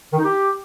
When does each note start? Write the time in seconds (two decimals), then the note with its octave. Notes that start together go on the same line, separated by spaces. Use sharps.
0.12 D#3
0.18 D#4
0.24 G4